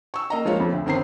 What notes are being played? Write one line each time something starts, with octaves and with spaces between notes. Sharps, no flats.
C#6 E6
A#3 D#5 A#5
F3 G#3 A#3 F4 C#5
F2
D2
G1 D#3 C4 A#5 C7